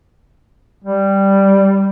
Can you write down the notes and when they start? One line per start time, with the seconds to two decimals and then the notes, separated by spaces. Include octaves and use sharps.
0.84 G3